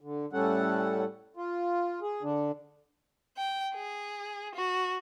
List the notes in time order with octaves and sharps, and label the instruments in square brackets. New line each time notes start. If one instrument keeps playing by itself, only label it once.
[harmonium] D3
A2 G3 C#4 A4 F#5
F4
G#4
D3 D4
[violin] G5
G#4
F#4